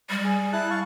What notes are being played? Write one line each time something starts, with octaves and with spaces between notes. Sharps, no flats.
G3
G#4
E4 A5 F#6
F5 C#6